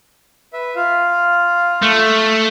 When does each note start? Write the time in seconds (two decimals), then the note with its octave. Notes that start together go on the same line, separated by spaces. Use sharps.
0.53 B4 E5
0.76 F4 F5
1.82 A3